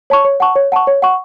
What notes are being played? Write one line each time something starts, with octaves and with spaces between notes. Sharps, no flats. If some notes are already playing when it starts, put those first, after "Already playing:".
C#5 A5 C#6
C#5
F#5 A5 C#6
C#5
F#5 A5 C#6
C#5
F#5 C#6